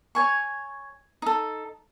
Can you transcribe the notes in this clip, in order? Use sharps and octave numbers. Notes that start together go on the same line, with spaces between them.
C#5 G#5 C#6
D#4 A4